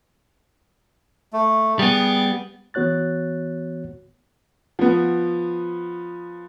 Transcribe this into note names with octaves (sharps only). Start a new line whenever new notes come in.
A3
G3 B3 G#4 G5
E3 B3 F#4 C#5 F#6 A6
F3 B3